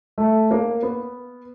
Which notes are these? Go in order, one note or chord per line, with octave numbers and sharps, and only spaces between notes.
A3
A#3
B3